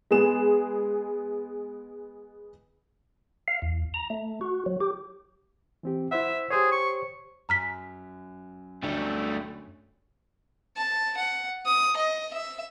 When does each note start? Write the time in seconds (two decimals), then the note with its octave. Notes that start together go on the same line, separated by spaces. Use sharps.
0.11 G#3 B3 G#4 E7
3.48 F5
3.62 E2
3.94 A#5
4.10 A3
4.41 F#4
4.66 F#3
4.80 G4
5.83 E3 C4 G4
6.11 E4 C5 E5 F#5
6.50 G4 G#4 C5 C#5
6.72 C#6
7.49 F#2 A#5 F6 B6
8.83 D2 G3 A3 C#5
10.76 A5
11.17 F#5
11.66 D#6
11.97 D#5
12.33 E5